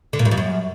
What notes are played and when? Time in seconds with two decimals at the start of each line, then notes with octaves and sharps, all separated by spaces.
0.13 D3
0.19 A#2
0.25 G2
0.31 F2
0.37 F#2